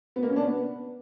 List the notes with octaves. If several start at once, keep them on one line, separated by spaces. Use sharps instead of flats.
B3
A#3
C#4
D4
B3